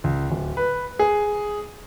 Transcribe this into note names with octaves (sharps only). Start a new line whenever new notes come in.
C#2
D1
B4
G#4